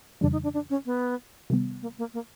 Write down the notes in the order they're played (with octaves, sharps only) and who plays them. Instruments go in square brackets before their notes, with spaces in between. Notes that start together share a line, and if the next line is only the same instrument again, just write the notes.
[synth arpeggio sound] F2 C#3 E3 G3 [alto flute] D4
[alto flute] D#4
D4
D4
C#4
B3
[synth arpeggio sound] C3 D#3 G3 B3
[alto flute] A#3
A#3
A#3